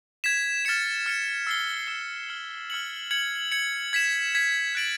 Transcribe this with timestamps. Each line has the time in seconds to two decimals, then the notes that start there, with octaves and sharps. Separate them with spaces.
0.24 G#6 B6 E7
0.65 F6 A6 C#7 E7
1.06 F6 A6 C#7 E7
1.47 E6 A6 C7 E7 G7
1.87 E6 A6 C7 E7 G7
2.29 F6 G#6 C#7 F#7
2.70 F6 G#6 C#7 F#7
3.11 G#6 C#7 F#7
3.51 G#6 C#7 F#7
3.93 G#6 B6 E7
4.35 G#6 B6 E7
4.75 F#6 A6 D7 F#7